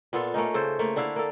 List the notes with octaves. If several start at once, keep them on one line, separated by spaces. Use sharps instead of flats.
A#2 B3 F4 A4
A3 A#3 C#4 D#4
C#3 A4 C5
A3 A#3
D3 D4 E4 F5
A#3 A4